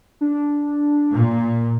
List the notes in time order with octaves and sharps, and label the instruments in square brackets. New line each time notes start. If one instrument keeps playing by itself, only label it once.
[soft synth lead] D4
[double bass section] A#2